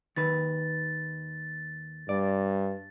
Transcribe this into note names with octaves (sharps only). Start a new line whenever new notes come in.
D#2 D#3 B4 A6
G2 D5